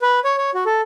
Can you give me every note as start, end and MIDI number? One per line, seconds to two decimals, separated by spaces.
0.02 0.20 71
0.24 0.37 73
0.38 0.50 73
0.54 0.64 66
0.66 0.81 69